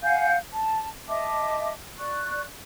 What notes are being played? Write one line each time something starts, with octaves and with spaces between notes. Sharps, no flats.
F5 F#5 G#5 G6
A5
D#5 E5 A5 D6
D5 C#6 F#6